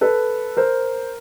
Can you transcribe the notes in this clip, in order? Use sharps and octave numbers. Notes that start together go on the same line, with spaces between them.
A4 B4
A#4 C5